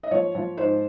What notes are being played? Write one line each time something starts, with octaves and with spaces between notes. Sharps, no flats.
D#5
F3 C#5
F3
G#2 C5